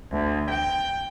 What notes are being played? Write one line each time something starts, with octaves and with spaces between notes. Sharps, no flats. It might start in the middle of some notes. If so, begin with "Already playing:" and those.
D2
G5